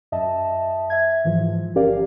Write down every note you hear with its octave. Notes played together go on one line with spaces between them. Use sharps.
F#2 D#5 E5 A5
E5 G#6
G#2 E3 F3
G1 C#4 G4 A#4 D5 F5